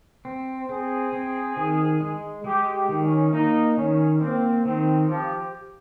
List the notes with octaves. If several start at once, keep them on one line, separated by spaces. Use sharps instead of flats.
C4
C4 G#4
C4
D#3
G#3
G#3 G4
G4
D#3
C#4
A#3 D#4
D#3 C#4
A#3 C4
D#3 C4
F3 G4